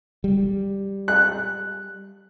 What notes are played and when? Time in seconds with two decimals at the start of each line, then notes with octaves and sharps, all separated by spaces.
0.24 G3
1.08 F#6